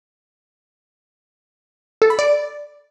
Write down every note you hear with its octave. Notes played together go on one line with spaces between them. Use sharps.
A4
B5
D5